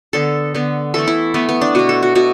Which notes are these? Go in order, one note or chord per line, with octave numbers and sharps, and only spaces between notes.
D3 B3 A4
D3 B3
E3 A3 A4
E4
E3 A3 B3
B3
D4
B2 B3 F#4
A4
F#4
B2 B3 F#4